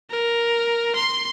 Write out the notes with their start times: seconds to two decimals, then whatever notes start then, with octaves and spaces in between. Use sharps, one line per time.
0.11 A#4
0.95 C6